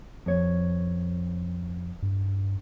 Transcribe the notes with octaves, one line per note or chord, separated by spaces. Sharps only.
F2 C#5
G2